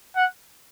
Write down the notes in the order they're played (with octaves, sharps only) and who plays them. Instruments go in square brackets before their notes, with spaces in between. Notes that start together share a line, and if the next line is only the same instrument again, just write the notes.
[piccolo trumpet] F#5